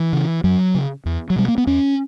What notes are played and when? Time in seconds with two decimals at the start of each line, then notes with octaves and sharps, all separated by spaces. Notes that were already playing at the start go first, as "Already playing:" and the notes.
Already playing: E3
0.13 C#3
0.44 F#2 F#3
0.74 C#3
1.06 E2
1.30 F#3
1.36 B2 G3
1.48 A#3
1.58 B3
1.67 E2 C#4